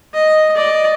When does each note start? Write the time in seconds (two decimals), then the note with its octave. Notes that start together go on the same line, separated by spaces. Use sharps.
0.14 D#5
0.55 D5 D#5